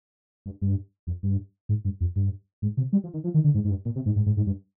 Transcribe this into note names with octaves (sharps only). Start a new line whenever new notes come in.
G2
G2
F2
G2
G#2
G2
F2
G2
G#2
C3
G3
F3
D#3
F3
D#3
D3
G#2
G#2
G2
A#2
C3
G#2
G#2
G#2
G#2
G2